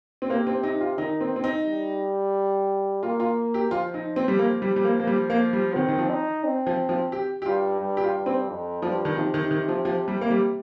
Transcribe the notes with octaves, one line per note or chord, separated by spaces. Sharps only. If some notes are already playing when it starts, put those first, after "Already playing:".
C4
C3 A#3
C4
D#4
F4
D#3 D#4
C4
C4
D#4
G3
A#3 F4
F4
G4
F3 F4
D#4
C4
G3
A#3
G3
G3
A#3
A#3
G3
A#3
G3
D#3 C4
D#3
F3
D#4
C4
F3
F3
G4
G4
G2 F4
G2
G4
F4
G2
C4
F2
G2 F3
D#3
C3 F3
D#3
D#3
F3
F3
G3
A#3
G3